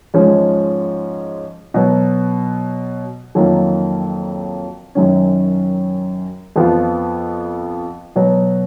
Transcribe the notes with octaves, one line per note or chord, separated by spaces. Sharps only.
G#2 F3 G#3 C#4
B2 F#3 B3
F2 D#3 F#3 A#3 F4
F#2 D#3 F#3 C#4
F2 F3 B3 F4
B2 F#3 B3